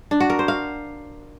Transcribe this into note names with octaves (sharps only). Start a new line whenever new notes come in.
D4
F#4
A#4
C5
F5